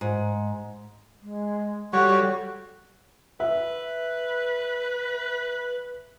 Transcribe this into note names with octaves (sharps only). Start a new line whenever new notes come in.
G#2
G#3
G3 F#4 A4 C#5 C#6
B4 E5